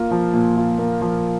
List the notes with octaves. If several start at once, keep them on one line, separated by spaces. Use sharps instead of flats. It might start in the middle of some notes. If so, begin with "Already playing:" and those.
Already playing: A#3 F4
F3
A#2
F4
A#3
F3